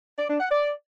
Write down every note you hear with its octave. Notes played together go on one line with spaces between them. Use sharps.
D5
D4
F#5
D5